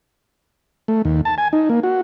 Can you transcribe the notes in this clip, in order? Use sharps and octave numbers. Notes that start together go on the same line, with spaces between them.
A3
D#2
A5
G#5
D#4
A#3
F#4